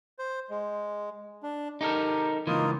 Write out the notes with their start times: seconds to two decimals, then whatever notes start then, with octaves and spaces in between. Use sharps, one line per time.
0.19 C5
0.50 G#3
1.43 D4
1.81 D#4 G4 A4 A#4
2.47 C#2 E3 A#3 D#4 F4